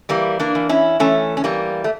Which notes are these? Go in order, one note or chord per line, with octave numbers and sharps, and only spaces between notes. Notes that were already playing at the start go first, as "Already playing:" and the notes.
E3 G3 A#3
A#3 D4
E3
C#4 E4
E3 A3 C#4
C#4
E3 G3 A#3
A3